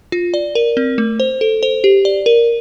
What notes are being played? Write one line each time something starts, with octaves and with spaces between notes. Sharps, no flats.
F4
D5
A#4
C4
A3
C5
A4
C5
G4
D5
A#4